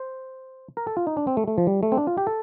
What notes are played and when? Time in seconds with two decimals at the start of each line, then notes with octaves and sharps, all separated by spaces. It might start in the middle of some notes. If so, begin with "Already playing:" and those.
Already playing: C5
0.77 A#4
0.87 A4
0.97 F4
1.07 D#4
1.17 D4
1.27 C4
1.37 A3
1.48 A3
1.58 F3
1.67 G3
1.83 A3
1.92 C4
1.97 D4
2.07 F4
2.17 G4
2.27 A4